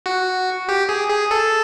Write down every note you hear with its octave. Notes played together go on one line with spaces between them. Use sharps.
F#4
G4
G#4
G#4
A4